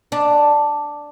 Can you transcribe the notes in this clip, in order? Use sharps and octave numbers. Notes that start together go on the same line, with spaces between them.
D4